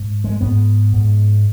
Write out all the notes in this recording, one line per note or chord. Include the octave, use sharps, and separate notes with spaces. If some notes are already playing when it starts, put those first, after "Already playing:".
Already playing: G#2
G#3
G#2 B3
G#2